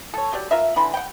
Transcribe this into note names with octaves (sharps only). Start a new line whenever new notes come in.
A4 C#5
F#3 G4 D5
F4 A#4 E5
D3 E3 B5 C6
F#5 G5